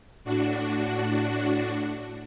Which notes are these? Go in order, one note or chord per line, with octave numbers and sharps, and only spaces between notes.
A2 D4 F#4